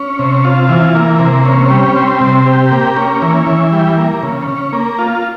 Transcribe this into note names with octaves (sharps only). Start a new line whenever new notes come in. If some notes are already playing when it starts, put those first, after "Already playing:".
Already playing: C#4
C3
F4
E3
A#3
C3
C#4
G3
C4
C3
G4
A#3
C#4
E3
E3
G3
A#3
C#3
C#4
A#3
F4